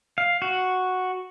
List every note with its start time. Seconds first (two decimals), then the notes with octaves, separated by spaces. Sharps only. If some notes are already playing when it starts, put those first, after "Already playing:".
0.18 F5
0.42 F#4